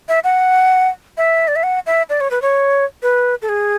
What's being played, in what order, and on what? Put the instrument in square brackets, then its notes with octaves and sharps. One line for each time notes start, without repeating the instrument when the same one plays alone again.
[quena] E5
F#5
E5
D5
E5
F#5
E5
D5
C#5
B4
C#5
B4
A4
G#4